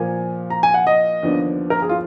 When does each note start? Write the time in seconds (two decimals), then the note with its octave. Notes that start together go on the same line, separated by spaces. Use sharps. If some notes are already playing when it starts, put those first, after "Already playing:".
Already playing: A#2 F3 A#3 G#5
0.50 A#5
0.63 G#5
0.74 F#5
0.87 D#5
1.23 D#2 D3 F3 B3 D4
1.70 A#4
1.82 G#4
1.89 F4